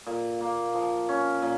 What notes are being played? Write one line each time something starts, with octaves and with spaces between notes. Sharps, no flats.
A#2
A#3
F3
C#4
A#2